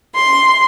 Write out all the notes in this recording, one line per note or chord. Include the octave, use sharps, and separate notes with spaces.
C6